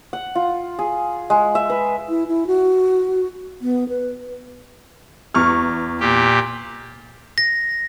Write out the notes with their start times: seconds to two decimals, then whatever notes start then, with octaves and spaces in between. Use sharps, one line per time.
0.13 F#5
0.35 F4
0.79 G#4
1.30 G#3
1.55 E5
1.70 B4
2.09 E4
2.28 E4
2.47 F#4
3.61 B3
3.89 B4
5.34 E2 C#6 F6
6.00 A#2 G4
7.38 A#6